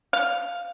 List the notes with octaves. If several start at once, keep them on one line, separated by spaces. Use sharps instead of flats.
F5